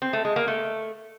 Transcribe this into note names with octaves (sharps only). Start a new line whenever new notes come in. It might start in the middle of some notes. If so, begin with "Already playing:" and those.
C4
A3
G#3
A#3
A3